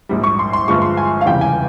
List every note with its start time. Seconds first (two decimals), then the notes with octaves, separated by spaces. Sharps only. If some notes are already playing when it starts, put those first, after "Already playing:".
0.09 A#1 G#2 G3
0.24 C#6
0.39 C6
0.53 C6
0.68 G1 G2 F3 G#3 C#6
0.82 C6
0.97 G#5
1.21 F5
1.26 F1 E2 C#3 G3 G5
1.41 G#5